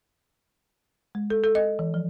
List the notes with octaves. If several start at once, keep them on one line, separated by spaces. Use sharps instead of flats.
G#3
A4
A4
D#5
E3
F3